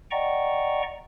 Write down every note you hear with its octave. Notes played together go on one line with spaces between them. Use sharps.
D5 D#5 F#5 G5 A#5 C#6